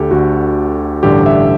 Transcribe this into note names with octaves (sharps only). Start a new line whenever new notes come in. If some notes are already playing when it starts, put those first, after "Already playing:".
Already playing: D2 D3 G4 A4
D2 D3 F#4
A1 G2 D3 G4
E5